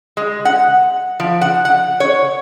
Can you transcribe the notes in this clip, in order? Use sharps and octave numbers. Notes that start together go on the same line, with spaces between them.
G#3
F#5
F3
F#5
F#5
C#5